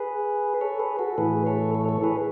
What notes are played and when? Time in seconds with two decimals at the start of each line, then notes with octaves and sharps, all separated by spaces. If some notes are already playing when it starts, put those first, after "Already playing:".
Already playing: G#4 B4
0.61 A4 C#5
0.79 G#4 B4
0.99 F#4 A4
1.18 A2 E3 G#4 B4
1.46 A4 C#5
1.75 A4 C#5
1.89 A4 C#5
2.03 G#4 B4